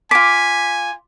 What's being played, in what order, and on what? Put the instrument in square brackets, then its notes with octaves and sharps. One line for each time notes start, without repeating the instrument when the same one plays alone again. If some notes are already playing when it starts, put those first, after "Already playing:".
[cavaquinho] F4 D6 [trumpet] G#5 [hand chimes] B6